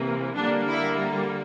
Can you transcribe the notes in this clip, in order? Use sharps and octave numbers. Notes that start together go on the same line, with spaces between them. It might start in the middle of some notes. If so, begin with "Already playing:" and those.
Already playing: C3 E3 A#3
D3 G3 A#3 D4
E4